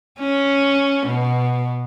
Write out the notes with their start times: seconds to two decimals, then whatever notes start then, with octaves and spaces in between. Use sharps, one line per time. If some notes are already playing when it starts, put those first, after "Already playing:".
0.19 C#4
1.06 B2